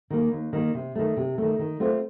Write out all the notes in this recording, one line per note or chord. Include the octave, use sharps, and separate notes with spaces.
D#3 A#3
D#2
D#3 A#3
C3
D#3 A3
C3
D#3 A3
D#3
A3 C4 F4